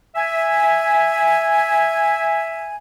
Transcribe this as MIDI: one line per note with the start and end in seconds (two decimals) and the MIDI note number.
0.15 2.75 76
0.15 2.75 80